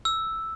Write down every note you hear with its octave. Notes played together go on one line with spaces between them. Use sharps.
E6